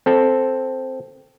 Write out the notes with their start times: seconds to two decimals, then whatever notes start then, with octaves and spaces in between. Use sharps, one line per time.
0.06 C4 A4